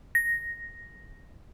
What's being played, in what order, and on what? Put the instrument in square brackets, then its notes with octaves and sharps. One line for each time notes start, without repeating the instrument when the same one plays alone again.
[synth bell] A#6